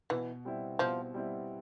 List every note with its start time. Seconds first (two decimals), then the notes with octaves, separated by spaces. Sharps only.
0.10 B2 E3
0.45 G3 C4 E4
0.79 B2 F3
1.14 G3 C4 E4